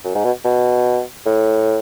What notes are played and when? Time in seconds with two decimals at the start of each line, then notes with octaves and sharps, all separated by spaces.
0.04 F#2
0.15 G#2
0.24 B2
0.44 B2
1.26 A2